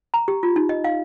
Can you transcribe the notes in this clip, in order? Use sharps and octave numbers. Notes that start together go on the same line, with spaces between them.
A#5
G4
F4
D#4
D#5
F5